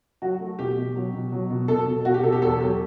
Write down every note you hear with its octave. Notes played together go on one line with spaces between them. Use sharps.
F#3 F#4
A3
B2 G4
B2
F#3
B2
F#3
B2
B2 A4
B2
B2 F#4
G4
B2 A4
G4
E2 A4
F#3 G4